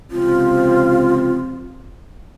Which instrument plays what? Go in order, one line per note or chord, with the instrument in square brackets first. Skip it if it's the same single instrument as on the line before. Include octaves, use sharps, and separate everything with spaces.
[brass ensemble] C#2 C3 F3 C4 [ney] F4